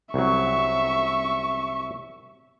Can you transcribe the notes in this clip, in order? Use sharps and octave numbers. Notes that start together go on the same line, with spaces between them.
C2 F#3 E5 C#6